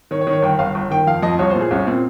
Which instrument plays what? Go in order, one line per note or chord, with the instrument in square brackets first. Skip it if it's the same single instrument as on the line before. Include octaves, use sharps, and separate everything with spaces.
[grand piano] D#3 C#5
C#5
D#3
C#5
G1 G5
G1 F5
G1
D#3 G5
F2 F5
F2 D#5
C2 C#5
C5
A#2
G#4
C2 C#4
A#2 C4